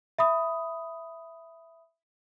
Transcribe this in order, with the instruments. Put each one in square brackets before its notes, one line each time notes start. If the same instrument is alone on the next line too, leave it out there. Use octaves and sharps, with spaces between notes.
[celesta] E5 B5 D#6